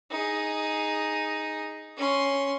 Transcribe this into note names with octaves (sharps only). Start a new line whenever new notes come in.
D#4 G#4
C#4 C6